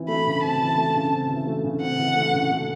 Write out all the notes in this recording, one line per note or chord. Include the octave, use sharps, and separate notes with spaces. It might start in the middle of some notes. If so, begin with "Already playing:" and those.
Already playing: E3 C4
A3 B5
C#3
C4 A5
E3
A3
C#3
C4
E3
A3
C#3
C4 F#5
E3
A3
C#3
A3